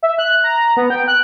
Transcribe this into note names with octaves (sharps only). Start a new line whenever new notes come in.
E5
F#6
A#5
B3
G5
F#6